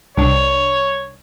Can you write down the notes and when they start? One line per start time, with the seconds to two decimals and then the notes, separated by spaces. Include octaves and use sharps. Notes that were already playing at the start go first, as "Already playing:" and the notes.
0.17 C2 D4 C#5